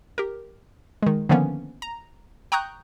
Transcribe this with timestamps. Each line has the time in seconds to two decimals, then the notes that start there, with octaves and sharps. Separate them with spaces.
0.18 G4 A#4
1.02 D#3 G#3
1.29 D3 D#3 F3 A#3 B3 C#4
1.82 A#5
2.52 G5 A#5 C#6 D#6 F#6 G6